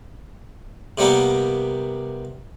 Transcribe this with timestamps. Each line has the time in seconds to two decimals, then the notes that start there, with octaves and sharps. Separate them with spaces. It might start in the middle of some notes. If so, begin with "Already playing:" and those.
0.98 C3 G3 A#3 B3